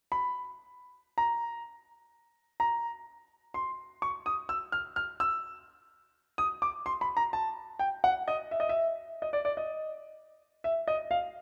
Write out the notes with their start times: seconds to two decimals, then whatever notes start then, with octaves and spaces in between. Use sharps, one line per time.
0.12 B5
1.18 A#5
2.60 A#5
3.54 C6
4.02 C#6
4.26 D#6
4.49 E6
4.72 F6
4.96 F6
5.20 E6
6.38 D#6
6.62 D6
6.86 C6
7.01 B5
7.17 A#5
7.33 A5
7.79 G5
8.04 F#5
8.28 D#5
8.51 E5
8.60 D#5
8.69 E5
9.22 D#5
9.33 D5
9.45 D5
9.57 D#5
10.64 E5
10.88 D#5
11.11 F5